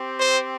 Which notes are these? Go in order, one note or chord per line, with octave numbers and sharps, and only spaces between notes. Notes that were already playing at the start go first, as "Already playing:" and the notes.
Already playing: C4 G4
C5